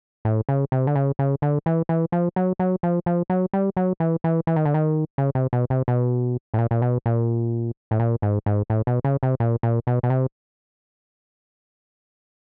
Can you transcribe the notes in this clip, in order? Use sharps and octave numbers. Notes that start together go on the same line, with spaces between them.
A2
C#3
C3
D3
C#3
C#3
D3
E3
E3
F3
F#3
F#3
F3
F3
F#3
G3
F#3
E3
E3
E3
D#3
D3
D#3
C#3
C3
B2
C3
B2
A2
A#2
A#2
B2
A#2
A2
A#2
G#2
G#2
A2
B2
C#3
C3
A#2
A#2
B2
B2
C3